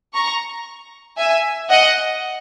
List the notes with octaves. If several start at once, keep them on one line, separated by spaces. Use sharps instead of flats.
A#5 C#6
E5 G#5
D#5 F#5